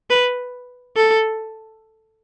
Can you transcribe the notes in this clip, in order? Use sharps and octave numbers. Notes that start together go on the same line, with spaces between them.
B4
A4